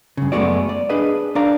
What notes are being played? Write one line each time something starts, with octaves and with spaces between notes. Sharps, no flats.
G2 C#3
F#2 G#3 A3 B3 F#4 D5
D5
D4 G#4 B4 D#5
D4 A#4 D5 F5 A#5